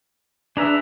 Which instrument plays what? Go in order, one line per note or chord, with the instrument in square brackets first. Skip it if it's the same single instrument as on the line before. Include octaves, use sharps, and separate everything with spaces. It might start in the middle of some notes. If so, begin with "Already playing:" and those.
[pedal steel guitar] D4 A#5 [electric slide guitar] G#4 B4 E5